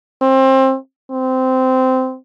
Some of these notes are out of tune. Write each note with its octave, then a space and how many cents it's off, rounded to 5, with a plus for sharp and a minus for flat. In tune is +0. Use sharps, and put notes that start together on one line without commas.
C4 +25
C4 -15